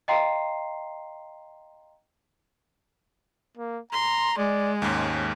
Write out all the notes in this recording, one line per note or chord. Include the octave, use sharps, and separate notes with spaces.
D#5 F5 G5 A#5 C6 C7
A#3
A#5 C6
G#3 D5
D#2 G#2 C#4